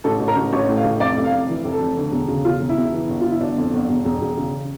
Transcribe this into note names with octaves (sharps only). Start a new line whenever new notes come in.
A1 A4
A1
A#4
A1
A1 C#5
A2
F5
A1
F1 D5
F1
F5
F1
E3
F1
A4
F1
D2
E1
C#3
E1 F4
E1
E4
E1
E3
G1
G1 F4
E4
G1 D4
F2
G1
E1
E1
E1
C#3